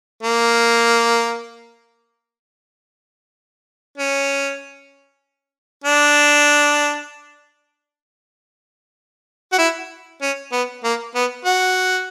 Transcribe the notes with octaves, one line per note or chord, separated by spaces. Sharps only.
A#3
C#4
D4
F#4
E4
C#4
B3
A#3
B3
F#4